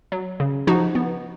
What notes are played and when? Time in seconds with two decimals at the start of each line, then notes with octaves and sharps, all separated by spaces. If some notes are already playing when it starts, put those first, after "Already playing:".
0.12 F#3
0.40 C#3
0.67 F3 D#4 F#4
0.95 B3